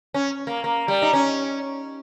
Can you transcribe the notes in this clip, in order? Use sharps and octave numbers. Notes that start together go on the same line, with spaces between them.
C#4
A#3
A#3
G3
D#4
C#4